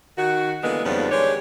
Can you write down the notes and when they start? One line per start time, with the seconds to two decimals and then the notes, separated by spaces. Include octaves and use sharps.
0.18 D#3 F#4
0.64 D3 E3 G3 G#3 A#3 B3
0.85 F2 G#2 C#3 F3 G3 B3
1.11 D#3 G#3 D4 G4 C#5